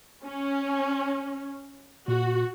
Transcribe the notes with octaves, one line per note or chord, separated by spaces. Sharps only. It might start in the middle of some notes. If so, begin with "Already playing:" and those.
C#4
A#2 F#4